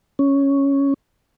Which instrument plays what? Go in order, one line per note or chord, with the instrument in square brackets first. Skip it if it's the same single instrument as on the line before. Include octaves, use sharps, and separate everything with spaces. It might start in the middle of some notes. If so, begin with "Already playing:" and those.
[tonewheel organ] C#4